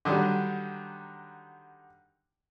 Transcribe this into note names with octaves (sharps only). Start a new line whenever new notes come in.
D3 D#3 F#3 G3